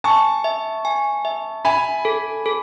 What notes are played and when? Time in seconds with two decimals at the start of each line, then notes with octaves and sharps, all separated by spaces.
0.04 G#5 A5 C#6
0.44 E5
0.85 G#5
1.25 E5
1.65 E5 G#5 B5
2.05 A4
2.46 A4